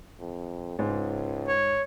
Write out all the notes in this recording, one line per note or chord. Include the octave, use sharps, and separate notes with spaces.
F2
C#2 G#2
C#5